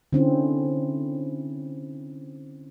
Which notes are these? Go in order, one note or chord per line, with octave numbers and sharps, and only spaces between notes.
D3 C4 C#4 E4